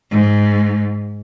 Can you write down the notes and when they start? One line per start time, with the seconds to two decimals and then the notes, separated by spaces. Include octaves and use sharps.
0.11 G#2